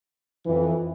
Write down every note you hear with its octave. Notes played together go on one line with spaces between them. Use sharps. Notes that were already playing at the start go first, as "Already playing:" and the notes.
F2 E3